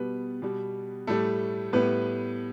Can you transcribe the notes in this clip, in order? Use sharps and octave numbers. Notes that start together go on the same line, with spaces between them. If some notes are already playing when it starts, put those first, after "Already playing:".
Already playing: B2 G3 B3 B4
B2 G3
A2 G3 A3 A4
A2 G3 B3 B4